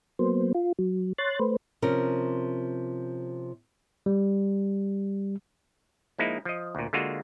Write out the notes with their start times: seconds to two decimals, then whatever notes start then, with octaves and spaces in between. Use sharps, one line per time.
0.19 F#3 A#3 B3 C5
0.55 F4
0.79 F#3
1.18 C#5 C6 F#6 A6
1.40 A3 B4 C5
1.82 C3 F3 C#4 A#4
4.06 G3
6.18 F3 G#3 A#3 D#4 E4
6.45 F3 D#5
6.75 D2 A#2
6.93 D3 G#3 A#3 F4 F#4